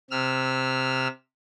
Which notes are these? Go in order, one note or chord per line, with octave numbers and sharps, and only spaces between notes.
C3 E6 F6